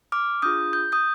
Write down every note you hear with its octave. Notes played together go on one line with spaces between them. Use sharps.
D6 F6
D4 F4 G#4 D#6 G6
G6
D#6 G6